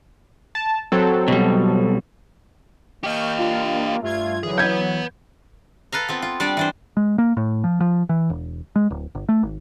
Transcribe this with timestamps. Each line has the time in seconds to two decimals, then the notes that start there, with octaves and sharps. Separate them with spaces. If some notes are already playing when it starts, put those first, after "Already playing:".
0.55 A5
0.92 F#3 C4 A4
1.28 B2 G3
3.04 A#3 G4 D#5 C#6 F6 G6
3.38 D4 F4
4.02 G2 A3 F4 G#6
4.43 D3 E3 F#3 G#4
4.58 E3 B3 B4 F#5 G6 G#6
5.92 A4 B4 F5 A#5
6.09 B3 C4 F4
6.22 F4
6.40 G3 D4 D5
6.57 E3 D4 C5
6.97 G#3
7.18 A#3
7.37 A2
7.64 F3
7.81 F3
8.09 E3
8.30 E1
8.76 G#3
8.91 D1
9.15 G1
9.29 A3
9.43 G#1